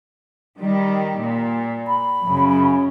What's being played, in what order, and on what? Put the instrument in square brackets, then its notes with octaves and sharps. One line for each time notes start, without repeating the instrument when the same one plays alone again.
[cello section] D#3 G3
A#2
[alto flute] B5
[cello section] F#2 C#3